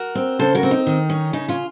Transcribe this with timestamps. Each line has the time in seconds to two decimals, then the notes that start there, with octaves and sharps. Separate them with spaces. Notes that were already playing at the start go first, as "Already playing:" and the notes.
Already playing: F#4 A#4
0.15 C4
0.39 C#3 A4 C5
0.55 F#4 A#4
0.63 C4
0.71 D#4
0.87 D#3
1.09 C#4
1.33 C#3 D#4
1.48 C#4 F4